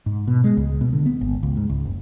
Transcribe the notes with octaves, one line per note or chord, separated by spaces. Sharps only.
G#2
B2
G#3
C#2
B2
D3
B3
G#1
C#2
G#2
C#2
F#1